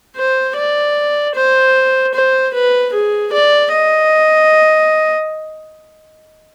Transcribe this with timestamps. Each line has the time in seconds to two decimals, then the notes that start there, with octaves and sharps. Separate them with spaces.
0.16 C5
0.56 D5
1.35 C5
2.14 C5
2.54 B4
2.93 G#4
3.32 D5
3.72 D#5